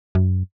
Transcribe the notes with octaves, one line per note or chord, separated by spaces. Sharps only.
F#2